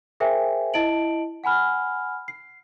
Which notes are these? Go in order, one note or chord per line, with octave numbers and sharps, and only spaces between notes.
G#4 A#4 C5 E5 G5 G#5
E4 D#5 A5 D7 F#7
F#5 G#5 B5 F6
C7